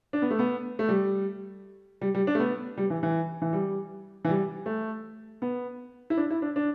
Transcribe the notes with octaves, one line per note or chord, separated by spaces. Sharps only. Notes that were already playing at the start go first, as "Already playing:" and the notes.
D4
B3
A3
B3
A3
G3
G3
G3
D4
A3
B3
G3
E3
E3
E3
G3
E3
G3
A3
B3
E4
D4
E4
D4
D4